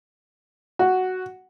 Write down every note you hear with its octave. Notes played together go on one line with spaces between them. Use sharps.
F#4